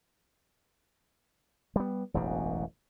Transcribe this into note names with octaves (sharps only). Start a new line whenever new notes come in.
G3 B3
E1 A1 F#2 B2